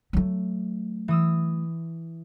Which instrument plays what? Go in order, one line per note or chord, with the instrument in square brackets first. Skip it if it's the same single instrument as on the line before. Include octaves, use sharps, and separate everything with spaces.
[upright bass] F#3 A3
[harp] E3 D#6 E6